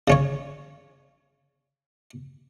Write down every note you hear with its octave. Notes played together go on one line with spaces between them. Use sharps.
C#3 C#4 C#5